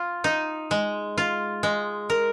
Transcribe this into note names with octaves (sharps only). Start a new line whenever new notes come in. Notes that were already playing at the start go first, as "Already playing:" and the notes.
Already playing: F4
D#4
G#3
F4
G#3
A#4